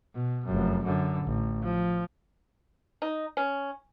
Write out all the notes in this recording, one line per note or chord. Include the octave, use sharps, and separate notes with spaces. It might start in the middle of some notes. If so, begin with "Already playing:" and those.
B2
F1 F#2
F#2 D3
A1
F3
D#4
C#4